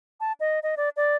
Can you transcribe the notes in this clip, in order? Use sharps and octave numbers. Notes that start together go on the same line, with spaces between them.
A5
D#5
D#5
D5
D5